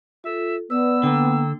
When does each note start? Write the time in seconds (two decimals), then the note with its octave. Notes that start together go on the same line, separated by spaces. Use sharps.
0.24 F4 A4 E5
0.70 B3 B4 D5 E6
1.03 D3 A#3 G5